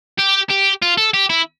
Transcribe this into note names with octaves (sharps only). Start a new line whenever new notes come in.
G4
G4
F4
A4
G4
E4